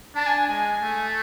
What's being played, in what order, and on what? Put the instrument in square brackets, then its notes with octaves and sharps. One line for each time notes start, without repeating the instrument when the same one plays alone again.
[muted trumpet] D4 [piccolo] A5
[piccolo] G#5
G#5
[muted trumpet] G#3 [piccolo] G#5
[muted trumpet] A3